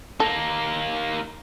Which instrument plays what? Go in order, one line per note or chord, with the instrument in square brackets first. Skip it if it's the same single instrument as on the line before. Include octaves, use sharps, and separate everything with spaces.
[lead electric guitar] A#3 D#4 [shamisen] A4